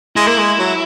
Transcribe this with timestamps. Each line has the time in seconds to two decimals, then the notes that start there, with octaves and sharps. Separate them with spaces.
0.16 G#3 E4
0.27 A#3
0.38 G#3
0.59 F#3